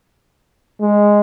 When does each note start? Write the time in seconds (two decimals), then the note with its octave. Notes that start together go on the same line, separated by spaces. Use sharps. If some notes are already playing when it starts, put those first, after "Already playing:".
0.81 G#3